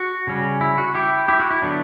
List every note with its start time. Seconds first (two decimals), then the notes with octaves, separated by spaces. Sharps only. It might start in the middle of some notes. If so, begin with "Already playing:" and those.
Already playing: F#4
0.27 C#3 G3 C#4
0.61 E4
0.78 F#4
0.95 E4 G4
1.28 E4 G4
1.40 F#4
1.51 E4
1.62 D3 F#3 B3 D4